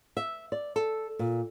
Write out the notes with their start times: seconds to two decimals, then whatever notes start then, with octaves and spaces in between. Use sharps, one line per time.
0.17 E5
0.52 D5
0.76 A4
1.19 A#2